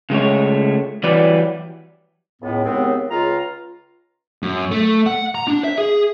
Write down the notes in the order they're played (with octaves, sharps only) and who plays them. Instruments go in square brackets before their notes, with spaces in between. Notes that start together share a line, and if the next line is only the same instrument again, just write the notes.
[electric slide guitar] C#3 G#3 A3 C#5
E3 F#3 G3 B4 D5
[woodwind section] C#2 A2 B3
D#2 C#3 G#3 B3 C4
C#2 F4 A#5
[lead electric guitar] F#2
A3
F#5
A#5
D4
E5
G#4